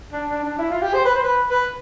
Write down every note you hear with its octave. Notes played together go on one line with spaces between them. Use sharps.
D4
D4
D4
E4
F4
G4
C5
B4
C5
B4
B4